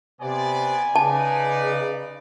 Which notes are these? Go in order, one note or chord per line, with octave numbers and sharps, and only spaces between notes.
C3 B3 C5 D5 G#5
C#3 D#4 B4 D5 A5